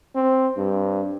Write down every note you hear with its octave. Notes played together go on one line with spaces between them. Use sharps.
C4
G2